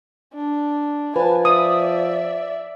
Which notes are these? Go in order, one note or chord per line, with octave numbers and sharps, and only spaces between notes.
D4
F3 B4 G#5 A5
D5 E5 D#6